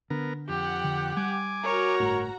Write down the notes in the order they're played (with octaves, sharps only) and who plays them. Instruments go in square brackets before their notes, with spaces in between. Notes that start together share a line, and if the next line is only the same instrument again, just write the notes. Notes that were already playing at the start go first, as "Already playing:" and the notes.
[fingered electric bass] D3 [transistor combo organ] B3 A#4
[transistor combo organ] F2 [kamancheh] G4 [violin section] F#5 G5
[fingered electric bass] D3
[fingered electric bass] G3 [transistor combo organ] G#5 D6
[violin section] F#4 A#5 [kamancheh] A#4 C#5
[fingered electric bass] G1 A2